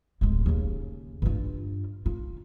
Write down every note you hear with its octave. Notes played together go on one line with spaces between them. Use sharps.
D1 G#3
D#2 C#3
G2 F4
F4